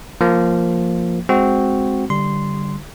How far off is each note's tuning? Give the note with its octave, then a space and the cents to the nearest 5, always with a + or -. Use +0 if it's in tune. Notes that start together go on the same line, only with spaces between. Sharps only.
F3 +0 A#3 -5
G#3 +0 C4 +0 F#4 +0
D3 +5 G3 +0 C6 -10